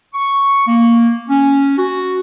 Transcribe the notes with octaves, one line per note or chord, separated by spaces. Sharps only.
C#6
A#3
C#4
F#4